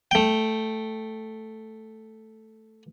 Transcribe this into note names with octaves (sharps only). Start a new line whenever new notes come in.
A3 G5